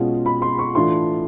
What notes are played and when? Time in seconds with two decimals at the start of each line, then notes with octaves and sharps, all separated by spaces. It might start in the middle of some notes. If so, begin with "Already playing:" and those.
Already playing: B2 G#3 C#4 F4
0.26 B5
0.42 C6
0.59 C#6
0.75 A2 E3 A3 D4 F4 C6